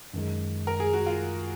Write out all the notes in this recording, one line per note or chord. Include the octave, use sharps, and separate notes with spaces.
F#2 D#3 G#3
A#4
G#4
F#4
F4